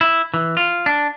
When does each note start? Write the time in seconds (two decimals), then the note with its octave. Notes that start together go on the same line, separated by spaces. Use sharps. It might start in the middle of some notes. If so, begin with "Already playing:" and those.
0.01 E4
0.34 E3
0.57 F4
0.86 D4